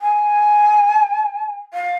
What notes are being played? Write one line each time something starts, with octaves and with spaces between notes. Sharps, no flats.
G#5
F5